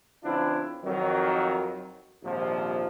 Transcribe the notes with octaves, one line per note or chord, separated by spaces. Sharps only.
C#3 E3 C4 D4 E4 F4
F2 D#3 F#3
A#1 D#2 G#2 C3 F3